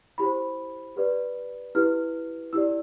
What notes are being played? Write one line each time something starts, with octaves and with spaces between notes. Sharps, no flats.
E4 G4 C5 B5
G4 B4 D5
E4 G4 B4 F6
E4 G4 D5 E6